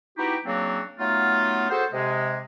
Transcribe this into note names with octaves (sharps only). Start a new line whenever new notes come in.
B3 D#4 E4 F#4 G4
C#3 F#3 A#3 C4 D4 F#4
F#3 A3 B3 D#4 F4
F#4 G#4 A4 C5
C3 G#3